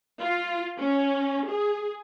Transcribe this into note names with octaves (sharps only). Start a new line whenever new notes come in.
F4
C#4
G#4